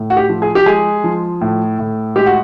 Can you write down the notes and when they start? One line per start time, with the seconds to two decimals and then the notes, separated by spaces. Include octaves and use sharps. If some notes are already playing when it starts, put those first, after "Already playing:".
Already playing: A2
0.10 F#4
0.17 G4
0.29 F3
0.42 G#4
0.55 G4
0.66 G#3 G#4
1.04 F3
1.41 A2
1.79 A2
2.16 G#3 G4
2.26 F#4